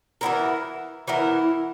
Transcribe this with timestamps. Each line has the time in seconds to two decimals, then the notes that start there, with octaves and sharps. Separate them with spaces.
0.21 E3 B3 E4 A#4
1.08 E3 B3 E4 A#4